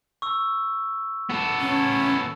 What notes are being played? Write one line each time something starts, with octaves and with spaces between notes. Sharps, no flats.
C#6 E6
B3 A4
C#4